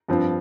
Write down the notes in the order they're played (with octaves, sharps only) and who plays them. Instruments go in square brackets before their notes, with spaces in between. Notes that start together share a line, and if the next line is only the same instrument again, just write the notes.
[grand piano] G2 F3 C4